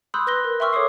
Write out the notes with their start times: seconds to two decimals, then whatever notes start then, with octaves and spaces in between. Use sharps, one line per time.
0.14 B5 C6 D#6 E6 F#6 G6
0.27 B4 F#6 A#6 G7
0.44 A#4
0.60 E5 G5 C6 C#6 E6 F6
0.73 A4 C#5 D6 D#6 C7